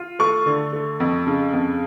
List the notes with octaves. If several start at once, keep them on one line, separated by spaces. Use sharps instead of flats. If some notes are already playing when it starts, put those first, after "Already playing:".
Already playing: F4
A3 C#6
D3
A3
F2
C#3
F2